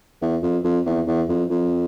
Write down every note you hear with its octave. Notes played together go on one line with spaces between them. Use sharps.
E2
F2
F2
E2
E2
F2
F2